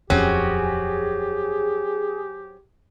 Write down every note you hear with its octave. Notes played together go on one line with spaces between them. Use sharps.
D#1 F2 F#3 C4 C#4 G4 G#4